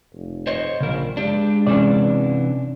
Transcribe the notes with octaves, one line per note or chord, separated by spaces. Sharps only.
F1
C5 C#5 D#5
A#1 C#3 A#4
G#3 D4 G4
C3 E3 C#4 D4 D5